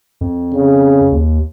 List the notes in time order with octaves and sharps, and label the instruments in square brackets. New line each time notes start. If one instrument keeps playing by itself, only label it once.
[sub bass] F2
[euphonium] C#3
[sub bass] D#2